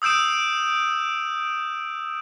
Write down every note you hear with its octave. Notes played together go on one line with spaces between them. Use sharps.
D#6 E6 G6 D7 E7